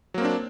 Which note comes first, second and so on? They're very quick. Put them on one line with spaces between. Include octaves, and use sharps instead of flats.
F#3 A#3 C4 D4